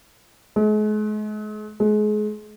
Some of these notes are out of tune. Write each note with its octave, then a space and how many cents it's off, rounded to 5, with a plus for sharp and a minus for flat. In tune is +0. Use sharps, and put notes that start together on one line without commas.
G#3 +40
G#3 +30